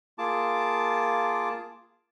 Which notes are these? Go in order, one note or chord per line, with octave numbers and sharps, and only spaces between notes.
A#3 F4 G#4 A5 D6